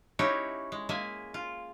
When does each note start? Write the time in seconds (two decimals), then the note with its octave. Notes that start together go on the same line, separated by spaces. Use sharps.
0.19 C#4 D#4 E4 F#4 G4 C#5
0.72 G#3
0.89 G#3 A#3 E5 G#5
1.34 F4